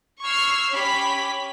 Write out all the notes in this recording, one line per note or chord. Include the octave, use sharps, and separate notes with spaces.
C#6 E6 F6 G#6 C7
C#4 G4 B5 B6